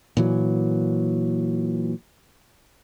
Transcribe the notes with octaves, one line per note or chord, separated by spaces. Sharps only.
A#2 E3 F#3